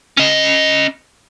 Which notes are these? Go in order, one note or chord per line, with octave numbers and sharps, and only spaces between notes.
C#4 D#5